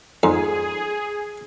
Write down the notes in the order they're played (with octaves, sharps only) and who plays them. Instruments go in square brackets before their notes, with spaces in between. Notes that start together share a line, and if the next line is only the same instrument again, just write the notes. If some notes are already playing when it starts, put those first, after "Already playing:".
[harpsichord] F2 [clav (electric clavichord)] G#2 [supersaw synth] G#4